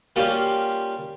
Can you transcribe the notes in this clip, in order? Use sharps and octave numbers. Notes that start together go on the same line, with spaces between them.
G3 A#3 C#4 F4 G4